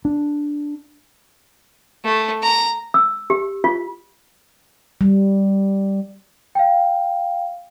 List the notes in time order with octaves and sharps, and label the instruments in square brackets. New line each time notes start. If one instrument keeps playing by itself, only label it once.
[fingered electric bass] D4
[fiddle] A3
A#5
[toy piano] E6
G4
F4
[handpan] G3
[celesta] F5 G5